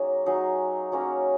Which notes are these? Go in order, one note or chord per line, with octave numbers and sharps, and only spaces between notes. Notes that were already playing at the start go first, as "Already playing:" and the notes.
Already playing: F#3 A#3 C#4 D#4 G#4 C#5
F#3 D#4 G#4
F#3 A#3 C#4 A#4